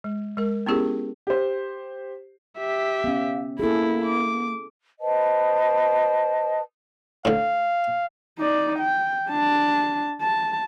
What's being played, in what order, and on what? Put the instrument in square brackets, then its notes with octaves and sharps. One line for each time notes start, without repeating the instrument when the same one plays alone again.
[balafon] G#3
G#3 A#4
B3 C#4 E4 G4 G#4 A#4
[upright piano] G4 C5
[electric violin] G4 E5
[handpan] B3 C#4 [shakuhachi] F5
[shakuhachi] A#3 [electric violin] E4 [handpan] G#4 A4
[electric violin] D6
[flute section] B4 C5 D#5 A5
[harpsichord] A2 D3 [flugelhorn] F5
[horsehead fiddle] D#4 D5
G5
D4 A5
A5